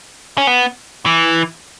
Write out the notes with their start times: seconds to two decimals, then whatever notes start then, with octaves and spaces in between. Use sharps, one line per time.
0.38 C#4
0.47 B3
1.06 E3